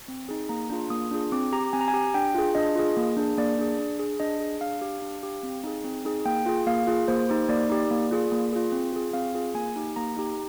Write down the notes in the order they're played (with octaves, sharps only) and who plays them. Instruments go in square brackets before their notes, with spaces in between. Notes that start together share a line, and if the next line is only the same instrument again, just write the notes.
[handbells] C4
D#4 G#4
A#3 A#5
D4 F4 G#4
A#3 D#6
D4 F4 G#4
C4 D6
G4 A#5
C4 G#5
A#5
G#5
G4
D4 G5
F4 G#4
D4 D#5
F4 G#4
A#3
D4 G#4
A#3 D5
D4 G#4
D4
G#4
D4 D#5
G#4
D4 F5
G4
D4
G4
C4
D#4 G#4
C4
D#4 G#4
A#3 G5
F4 G#4
A#3 F5
F4 G#4
A#3 C5
D#4 G4 C5
A#3 D5
D#4 G4
A#3
F4 G#4
A#3
F4 G#4
C4
F4 G#4
C4 F5
F4 G#4
A#3 G#5
D#4 G4
A#3 A#5
D#4 G4